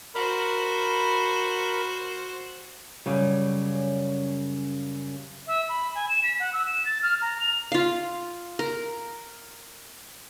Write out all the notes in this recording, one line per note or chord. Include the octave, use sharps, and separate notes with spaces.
F#4 A#4 C5 B5
F#2 C#3 G3
E5
B5
G#5
E7
B6
F#5
E6
E7
A6
F6
A#5
F7
F4 F5
A#4